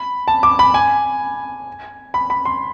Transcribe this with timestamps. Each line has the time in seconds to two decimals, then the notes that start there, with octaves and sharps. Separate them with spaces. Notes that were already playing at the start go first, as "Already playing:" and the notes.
Already playing: B5
0.28 A5
0.43 D6
0.59 B5
0.74 G#5
2.14 B5
2.30 B5
2.45 C6